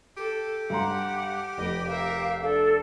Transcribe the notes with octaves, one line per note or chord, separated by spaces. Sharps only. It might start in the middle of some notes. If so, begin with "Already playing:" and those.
G4 A4
G2 F#5 A#5 C6
F1 B4 D#5
A#4 E5 F5
D4 A4